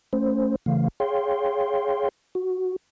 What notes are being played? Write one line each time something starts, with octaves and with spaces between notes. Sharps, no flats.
A3 C#4 C5
C#3 E3 A3 F5
G#4 C#5 F5 G5 C6
F#4